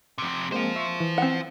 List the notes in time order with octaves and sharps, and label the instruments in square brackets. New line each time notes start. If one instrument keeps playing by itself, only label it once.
[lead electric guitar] F2 C3
[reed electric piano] G#3 A#3 C4 [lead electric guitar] C5 F5
[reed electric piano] E5 C6 C#6
E3
[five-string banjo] C4 F#5